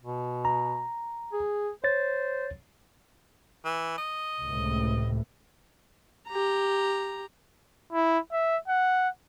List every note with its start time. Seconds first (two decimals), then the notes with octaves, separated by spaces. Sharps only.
0.02 B2
0.45 A#5
1.33 G#4
1.84 C5 C#5 A6
3.65 E3
3.98 D#5
4.44 C#2 A2 C3
6.28 G4 A#5
7.93 E4
8.32 E5
8.68 F#5